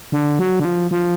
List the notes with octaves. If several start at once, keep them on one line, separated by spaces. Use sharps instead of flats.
D3
F#3
D3
F3
F3